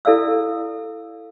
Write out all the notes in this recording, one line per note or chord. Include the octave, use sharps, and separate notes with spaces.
E4 A4 D5 F5 E6